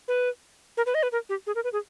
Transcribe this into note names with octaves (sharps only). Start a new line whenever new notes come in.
B4
A#4
B4
D#5
B4
A#4
G4
G#4
A#4
B4
G#4